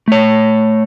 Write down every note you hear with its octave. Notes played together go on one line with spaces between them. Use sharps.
A3 C#5